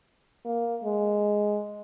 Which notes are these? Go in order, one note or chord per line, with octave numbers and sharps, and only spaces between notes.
A#3
G#3